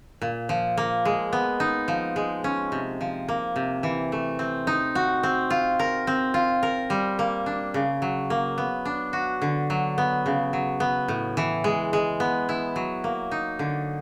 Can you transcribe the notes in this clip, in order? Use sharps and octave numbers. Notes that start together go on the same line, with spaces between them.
A#2
F3
A#3
G#3
B3
D#4
F3
G#3
C#4
C3
F3
A#3
C3
E3
A3
C4
D#4
F#4
C4
F4
A#4
C4
F4
A#4
G3
A#3
D4
C#3
F#3
A#3
B3
D4
F#4
D3
F#3
B3
C#3
F#3
B3
A2
E3
G#3
G#3
B3
E4
F#3
A#3
D#4
D3